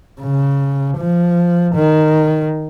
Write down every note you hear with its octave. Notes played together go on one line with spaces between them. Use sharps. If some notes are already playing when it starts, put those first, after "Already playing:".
C#3
F3
D#3